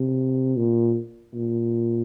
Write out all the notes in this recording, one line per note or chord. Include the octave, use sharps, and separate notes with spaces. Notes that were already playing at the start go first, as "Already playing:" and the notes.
Already playing: C3
A#2
A#2